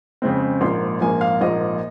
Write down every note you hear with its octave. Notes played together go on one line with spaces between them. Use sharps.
F2 C#3 G#3 C4
A#1 G#2 F3 A#3 C6
A#1 G#2 F3 A#3 G#5
F5
A#1 G#2 F3 A#3 D#5